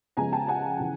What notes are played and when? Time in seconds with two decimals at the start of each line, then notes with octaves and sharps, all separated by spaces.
0.17 C#3 F3 G#3 B3 G#5 A#5
0.32 G5 A5
0.48 F#5 G#5
0.80 C#3 E3